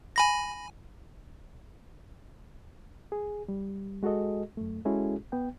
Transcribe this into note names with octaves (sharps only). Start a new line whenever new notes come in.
G#5 B5 A#6
G#4
G3
G#3 F#4 G#4 A4 D#5
F#2 A3
G#3 C#4 E4 F#4 G#4 A4
B3 G5